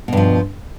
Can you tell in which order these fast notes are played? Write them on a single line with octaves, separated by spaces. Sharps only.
B2 G2 F3